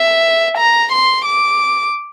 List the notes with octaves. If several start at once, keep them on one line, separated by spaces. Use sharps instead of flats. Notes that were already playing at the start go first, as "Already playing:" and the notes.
Already playing: E5
A#5
C6
D6